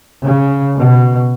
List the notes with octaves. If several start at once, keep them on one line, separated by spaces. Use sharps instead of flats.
C#3
B2